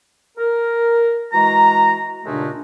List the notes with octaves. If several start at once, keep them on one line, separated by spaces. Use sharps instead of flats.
A#4
E3 G#3 F#4 A#5
D#2 A#2 C#3 G#3 A3 D4